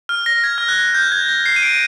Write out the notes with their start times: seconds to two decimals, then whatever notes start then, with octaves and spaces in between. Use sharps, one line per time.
0.09 F6
0.26 A#6
0.44 G#6
0.58 F6
0.68 F#6
0.95 G6
1.12 G#6
1.29 A#6
1.46 C7
1.56 D#7
1.63 D7